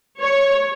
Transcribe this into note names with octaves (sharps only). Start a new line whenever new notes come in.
C#5